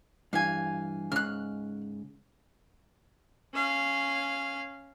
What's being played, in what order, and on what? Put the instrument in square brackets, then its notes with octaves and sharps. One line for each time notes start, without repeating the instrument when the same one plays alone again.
[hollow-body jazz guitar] G2 E3 [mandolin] F5 G#5
[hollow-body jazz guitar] G#2 C#3 [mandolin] F6 F#6
[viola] C#4 F5